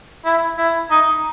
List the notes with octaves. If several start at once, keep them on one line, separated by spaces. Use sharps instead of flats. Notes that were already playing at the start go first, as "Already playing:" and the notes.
E4
E4
D#4